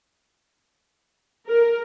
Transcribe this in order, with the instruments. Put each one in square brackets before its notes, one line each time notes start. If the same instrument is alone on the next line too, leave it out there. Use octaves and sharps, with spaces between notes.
[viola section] A#4